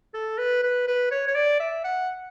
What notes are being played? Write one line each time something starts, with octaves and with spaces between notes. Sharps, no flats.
A4
B4
B4
B4
C#5
C#5
D5
E5
F#5